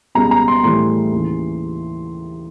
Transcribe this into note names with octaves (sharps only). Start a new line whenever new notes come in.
C#2 B2 G3 A#5
A#5
C6
A2 E3 G3 C6
D#2 C#3 E3